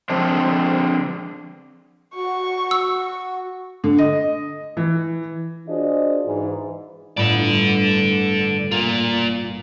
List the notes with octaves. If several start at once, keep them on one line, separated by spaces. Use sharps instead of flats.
D3 F3 G#3 C4 D4
F#4 C#6
E6
D3
D#5
E3
D4 F4 F#4 G#4 C5 D#5
G#2 E3
G1 A2 A4 D5
A#3 F4 A#4